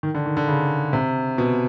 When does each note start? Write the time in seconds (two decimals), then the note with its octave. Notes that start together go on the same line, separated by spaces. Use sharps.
0.03 D#3
0.15 D3
0.26 D#3
0.37 D3
0.48 C#3
0.93 C3
1.38 B2